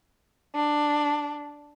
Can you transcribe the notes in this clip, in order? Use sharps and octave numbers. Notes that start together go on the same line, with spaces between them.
D4